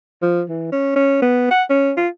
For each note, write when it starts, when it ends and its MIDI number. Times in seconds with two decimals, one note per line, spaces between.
0.22 0.43 53
0.49 0.69 52
0.72 0.91 61
0.96 1.21 61
1.22 1.48 59
1.51 1.63 78
1.70 1.92 61
1.97 2.08 65